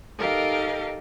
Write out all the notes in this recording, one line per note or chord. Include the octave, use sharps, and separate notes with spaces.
D#4 G4 A4 A#4 D#5 F5